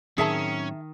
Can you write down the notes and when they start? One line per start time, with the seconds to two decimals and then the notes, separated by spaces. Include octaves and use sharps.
0.18 A2 D#3 F#3 C4 C#4 G#4 E5 A5